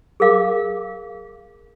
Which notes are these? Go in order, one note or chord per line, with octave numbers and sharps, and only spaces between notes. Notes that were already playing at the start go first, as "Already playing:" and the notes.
G#4 A#4 F5 D6